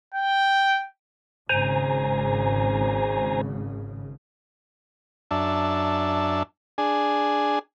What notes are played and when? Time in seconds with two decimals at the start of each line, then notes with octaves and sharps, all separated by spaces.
0.14 G5
1.49 G#1 C#3 C5 G#5 A#5
5.31 F#2 D4 E5 A5
6.78 D4 G#4 G#5